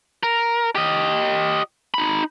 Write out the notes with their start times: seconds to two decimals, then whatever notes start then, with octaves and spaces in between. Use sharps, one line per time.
0.23 A#4
0.75 G4 D#5
1.94 D#4 B5